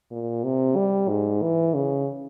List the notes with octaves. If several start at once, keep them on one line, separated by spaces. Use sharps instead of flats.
A#2
C3
G3
G#2
E3
C#3